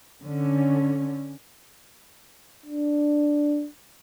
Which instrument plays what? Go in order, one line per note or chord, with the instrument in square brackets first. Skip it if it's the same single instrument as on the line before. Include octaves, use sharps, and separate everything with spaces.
[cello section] D3 C#4
[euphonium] D4